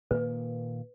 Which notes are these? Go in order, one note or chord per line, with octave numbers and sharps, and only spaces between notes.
A#2 D#3 A#3 B4